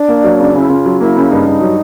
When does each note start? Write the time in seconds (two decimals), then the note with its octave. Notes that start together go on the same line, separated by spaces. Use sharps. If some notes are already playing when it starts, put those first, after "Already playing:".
Already playing: D4
0.09 A#3
0.24 F#3
0.40 C#3
0.55 C#3 E4
0.69 C#3 F4
0.86 F#3
1.01 A#3 E4
1.16 C#3
1.31 G2 D#4
1.46 G2
1.61 F#3